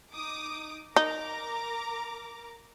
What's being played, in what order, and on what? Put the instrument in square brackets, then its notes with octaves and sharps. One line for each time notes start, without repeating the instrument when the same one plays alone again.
[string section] D#4 D6 D#6
[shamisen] D#4 [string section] A#4 A#5 D6